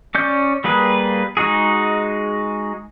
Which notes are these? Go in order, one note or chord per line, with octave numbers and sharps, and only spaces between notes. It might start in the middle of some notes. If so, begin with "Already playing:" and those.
C#4 D5 G6
G3 A#3 G#4 B4
G#3 D#4 F#4 G#4